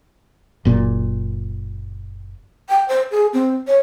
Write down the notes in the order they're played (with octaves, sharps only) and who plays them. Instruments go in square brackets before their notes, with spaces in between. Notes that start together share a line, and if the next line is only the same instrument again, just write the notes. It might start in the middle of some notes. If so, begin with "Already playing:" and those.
[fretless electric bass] F#1 A#2
[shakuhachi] G5
C5
G#4
C4
C#5